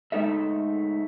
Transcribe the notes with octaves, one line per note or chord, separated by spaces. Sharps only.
G#3 A3 D#4 A4 E5